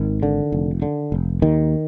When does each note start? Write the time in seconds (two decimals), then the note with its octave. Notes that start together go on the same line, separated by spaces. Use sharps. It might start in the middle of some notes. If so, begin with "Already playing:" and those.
Already playing: G#1 D#3
0.23 D3
0.52 F1
0.82 D3
1.12 F1
1.42 D#2 D#3